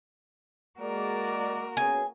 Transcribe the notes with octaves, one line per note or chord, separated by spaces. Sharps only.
G#3 A#3 F#4 A#4 D5
B2 C#4 G#4 G#5